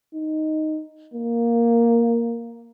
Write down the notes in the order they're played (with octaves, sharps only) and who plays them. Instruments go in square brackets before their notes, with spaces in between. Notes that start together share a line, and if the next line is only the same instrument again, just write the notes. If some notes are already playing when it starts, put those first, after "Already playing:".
[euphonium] D#4
A#3